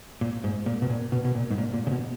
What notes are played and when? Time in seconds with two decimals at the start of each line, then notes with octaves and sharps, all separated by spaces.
0.21 A#2
0.44 G#2
0.66 A#2
0.82 B2
0.90 A#2
1.12 B2
1.25 B2
1.35 A#2
1.51 G#2
1.58 A#2
1.74 A#2
1.87 C#3
1.91 B2